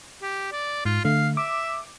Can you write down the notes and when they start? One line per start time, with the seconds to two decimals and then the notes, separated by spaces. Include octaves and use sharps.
0.22 G4
0.52 D5
0.85 G#2 F4
1.05 D3 A3 F5
1.37 E5 D6